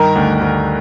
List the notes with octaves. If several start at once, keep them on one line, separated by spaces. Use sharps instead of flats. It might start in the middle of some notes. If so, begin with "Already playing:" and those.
Already playing: G2 D#3 A#4 A#5
D2
D2